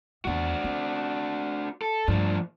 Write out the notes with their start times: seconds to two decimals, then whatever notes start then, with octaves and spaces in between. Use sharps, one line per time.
0.25 E2 D#3 D4 F#4
0.64 C4
1.82 A4
2.08 G2 F3 A3 D4